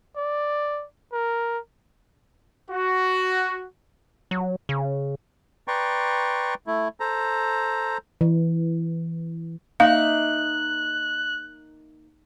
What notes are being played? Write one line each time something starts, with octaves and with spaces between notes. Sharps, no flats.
D5
A#4
F#4
F#3
C#3
B4 D5 G5 A#5 C6 C#6
A3 E4
A4 C5 A#5
E3
A#3 D#4 E5 F5 F#6